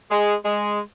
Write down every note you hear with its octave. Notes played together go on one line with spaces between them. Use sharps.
G#3
G#3